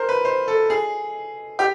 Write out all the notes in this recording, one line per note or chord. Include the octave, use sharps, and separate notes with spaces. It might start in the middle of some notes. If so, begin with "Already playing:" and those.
Already playing: A#4 C5
B4
C5
A4
G#4
G4